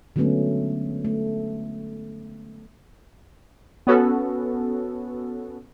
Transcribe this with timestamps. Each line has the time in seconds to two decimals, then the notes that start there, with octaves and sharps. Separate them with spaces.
0.16 D3 F#3 G#3 A3 B3 C#4
1.05 A3
3.87 B3 C#4 F#4 A4